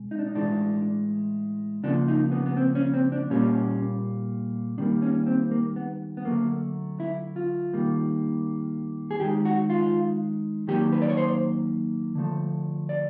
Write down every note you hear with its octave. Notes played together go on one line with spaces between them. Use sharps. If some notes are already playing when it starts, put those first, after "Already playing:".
Already playing: B2 G#3
D#4
D4
D#4
A2 E3 G#3 D4
C#3 F3 A#3 D4
D#4
B3
B3
C4
C#4
C4
D4
A#2 G3 A#3 C#4
D#3 G3 A#3 D4
C#4
C4
A#3
B3
B3
D3 F#3 A3 A#3
E4
F4
D#3 G3 A#3
G#4
D#3 G#3 G4
F#4
F4
D#3 F#3 A#3 G4
B4
D5
C#5
C5
D3 F3 A3
D5